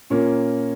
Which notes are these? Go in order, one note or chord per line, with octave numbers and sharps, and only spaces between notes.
A#2 A#3 C#4